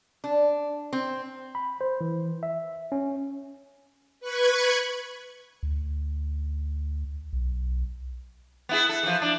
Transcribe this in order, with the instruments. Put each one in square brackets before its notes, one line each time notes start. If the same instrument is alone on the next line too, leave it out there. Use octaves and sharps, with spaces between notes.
[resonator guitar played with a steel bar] D4
C4
[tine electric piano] B5
C5
E3
E5
C#4
[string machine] B4 C#6 F#6 G#6
[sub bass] D2
B1
[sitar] B3 E4 G#4
A4
E3 F3
D4